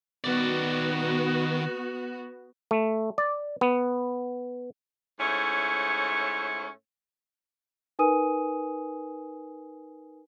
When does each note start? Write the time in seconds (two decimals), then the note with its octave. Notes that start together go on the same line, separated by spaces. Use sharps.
0.24 D#3 B3 F#4 D5
2.71 A3
3.18 D5
3.61 B3
5.19 G#2 A3 C#4 E4 C#5
7.99 D#4 A#4 B4 G#5 D#6 D#7